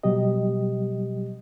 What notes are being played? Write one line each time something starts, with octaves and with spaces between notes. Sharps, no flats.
B2 F#3 G3 G4 D#5